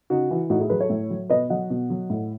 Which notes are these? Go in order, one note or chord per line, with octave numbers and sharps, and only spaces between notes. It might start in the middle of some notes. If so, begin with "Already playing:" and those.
C#3 D#4 F#4
E3
A2 D#4 F#4
E4 G#4
F#3 G#4 B4
A4 C#5
A2
F#3
B2 B4 D#5
F#3 D#5 F#5
B2
F#3
A2